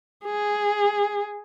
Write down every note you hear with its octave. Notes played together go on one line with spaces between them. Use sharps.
G#4